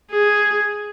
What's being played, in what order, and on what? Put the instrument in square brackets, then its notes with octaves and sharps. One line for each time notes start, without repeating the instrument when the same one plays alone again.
[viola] G#4